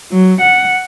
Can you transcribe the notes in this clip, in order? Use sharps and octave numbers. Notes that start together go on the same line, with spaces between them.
F#3
F#5